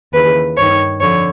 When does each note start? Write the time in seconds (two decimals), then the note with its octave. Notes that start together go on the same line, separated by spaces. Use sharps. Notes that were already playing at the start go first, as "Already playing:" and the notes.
0.13 D#2 C#3 E3 B4
0.57 G2 D#3 C#5
1.00 F2 D3 C#5